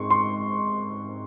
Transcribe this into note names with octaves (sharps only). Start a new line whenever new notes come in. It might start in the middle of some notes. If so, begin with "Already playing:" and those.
Already playing: G#2 C4 C6 C#6
C6